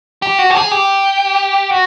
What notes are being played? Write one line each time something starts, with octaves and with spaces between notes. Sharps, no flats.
G4
F#4
G4
G#4
G4
F#4